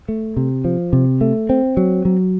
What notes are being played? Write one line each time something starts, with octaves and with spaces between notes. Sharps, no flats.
A3
C3
F3
C3
A3
C4
F#3
F#3